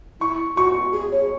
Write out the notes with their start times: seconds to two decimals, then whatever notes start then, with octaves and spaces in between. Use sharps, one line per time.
0.21 E4 C#6
0.57 F#4 C#6
0.93 G#4
1.12 C#5